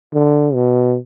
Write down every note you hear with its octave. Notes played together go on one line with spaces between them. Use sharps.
D3
B2